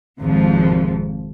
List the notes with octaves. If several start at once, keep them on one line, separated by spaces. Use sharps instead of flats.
G#1 F2 C3 F3